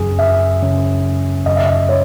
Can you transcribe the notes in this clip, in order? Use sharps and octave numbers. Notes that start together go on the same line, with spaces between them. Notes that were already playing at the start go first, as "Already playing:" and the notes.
Already playing: F#2 C#3 F#3 C#4 G#4
E5
F#2 C#3 F#3 C#4
F#2 C#3 F#3 C#4 D#5
E5
D#5
C#5